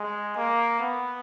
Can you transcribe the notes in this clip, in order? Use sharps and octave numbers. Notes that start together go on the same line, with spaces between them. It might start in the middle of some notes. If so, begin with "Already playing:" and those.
Already playing: G#3
A#3
B3